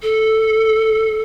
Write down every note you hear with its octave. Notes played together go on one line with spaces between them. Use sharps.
A4